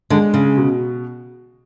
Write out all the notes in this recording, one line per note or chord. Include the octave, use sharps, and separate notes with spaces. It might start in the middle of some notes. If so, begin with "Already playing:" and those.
D3 G#3 D4
C#3
B2